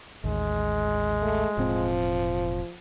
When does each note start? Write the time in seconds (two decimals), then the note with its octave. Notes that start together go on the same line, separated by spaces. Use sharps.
0.24 A1 D#2 G#3
1.22 A3
1.58 E1 A2 F3 C4